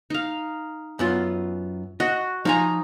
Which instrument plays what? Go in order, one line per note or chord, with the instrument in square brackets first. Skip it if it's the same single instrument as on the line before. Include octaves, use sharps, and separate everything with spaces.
[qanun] D#4 F5
[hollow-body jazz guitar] F#2 B3 F4
[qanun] F#4 [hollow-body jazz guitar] D#5
[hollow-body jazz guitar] F3 F5 G#5 [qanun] D#4 A#5